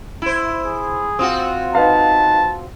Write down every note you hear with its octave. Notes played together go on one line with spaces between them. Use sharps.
E4 C5
G#4
C4 F4 F#4 D#6
D#4 B4 F5 A5